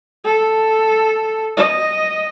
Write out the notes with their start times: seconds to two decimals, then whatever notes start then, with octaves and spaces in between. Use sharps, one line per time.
0.25 A4
1.57 D#5